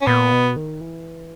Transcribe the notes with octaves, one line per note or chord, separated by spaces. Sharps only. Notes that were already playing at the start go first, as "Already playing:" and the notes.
C#4
A#2 B3
B2
D#3
E3